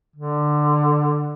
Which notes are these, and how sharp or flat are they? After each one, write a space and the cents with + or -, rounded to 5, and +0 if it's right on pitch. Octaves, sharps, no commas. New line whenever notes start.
D3 +15